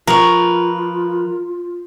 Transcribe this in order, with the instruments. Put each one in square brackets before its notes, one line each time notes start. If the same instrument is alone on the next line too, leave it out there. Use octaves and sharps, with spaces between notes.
[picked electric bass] F3 [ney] F4 [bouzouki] A#4 [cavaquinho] B4 C#6